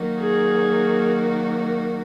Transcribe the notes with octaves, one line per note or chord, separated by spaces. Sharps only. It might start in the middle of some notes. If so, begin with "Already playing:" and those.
Already playing: D#3 F#3 A#3 D#4 F#4
G#4